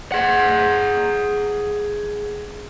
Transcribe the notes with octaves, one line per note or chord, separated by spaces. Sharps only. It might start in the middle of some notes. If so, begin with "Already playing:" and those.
G#4 F#5